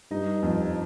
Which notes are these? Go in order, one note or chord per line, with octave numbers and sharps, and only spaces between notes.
G2 D#4
F2